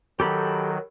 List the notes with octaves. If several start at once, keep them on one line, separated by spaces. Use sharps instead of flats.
D#3 F#3 G4 A4 B5